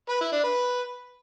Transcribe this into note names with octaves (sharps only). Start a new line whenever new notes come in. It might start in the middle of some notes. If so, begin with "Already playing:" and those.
B4
E4
D4
B4